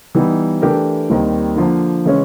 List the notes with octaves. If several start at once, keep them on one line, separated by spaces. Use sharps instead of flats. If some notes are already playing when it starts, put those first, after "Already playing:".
E3 G3 B3 D#4
E3 A3 D4 G4 A#4
D#2 D#3 G3 C4
D3 F3 A#3
C#3 E3 G#3 C#4